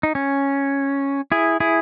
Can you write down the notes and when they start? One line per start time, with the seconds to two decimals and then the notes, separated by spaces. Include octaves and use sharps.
0.03 D#4
0.15 C#4
1.32 E4 G#4
1.60 E4 G#4